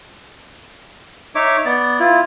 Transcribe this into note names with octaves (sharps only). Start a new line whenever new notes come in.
D#4 C#5 E5 D6
B3 D5
E4 F4